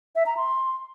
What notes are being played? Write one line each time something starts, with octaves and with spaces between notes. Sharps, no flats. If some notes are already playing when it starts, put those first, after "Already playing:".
E5
A#5
C6